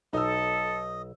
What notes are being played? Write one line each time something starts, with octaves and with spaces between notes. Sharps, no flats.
B1 D#4 A4 D#5 E6